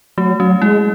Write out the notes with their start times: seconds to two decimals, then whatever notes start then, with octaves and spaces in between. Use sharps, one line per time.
0.18 F#3 A3
0.40 F#3 C#4
0.62 G#3 E4